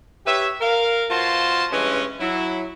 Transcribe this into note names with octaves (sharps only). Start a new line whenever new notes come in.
G4 B4 C#5 E5
A#4 F5
B2 F4 F#4 C5 A5 C6
G2 E3 G#3 C#4
F#3 E4